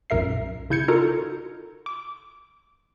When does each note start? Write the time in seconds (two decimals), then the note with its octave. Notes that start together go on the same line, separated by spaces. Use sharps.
0.10 B1 F#2 A#2 A#4 E5 C7
0.70 C#3 E4 G6 G#6 C#7
0.88 D#4 F4 F#4 A4 A#4
1.86 D6